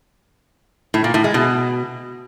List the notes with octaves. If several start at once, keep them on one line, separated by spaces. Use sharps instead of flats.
A2
A#2
A2
G#3
B2